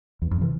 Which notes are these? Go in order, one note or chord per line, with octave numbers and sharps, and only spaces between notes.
E2
F2
C3 E3